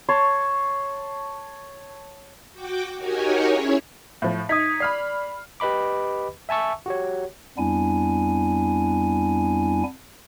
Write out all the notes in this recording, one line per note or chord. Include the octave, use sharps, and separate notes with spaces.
C#5 A5 C6
F#4 G5 D6
D#4 F#4 G4 A#4 C#5 G#5
C#4 E4 G#4 C#5
A2 F3
D#4 D#6 G#6 B6
D5 B5 F6 C7
G4 B4 D#5 B5 D6
E5 G#5 A5 C#6 E6
F#4 G4 C#5
F2 G3 B3 D4 E4 G#5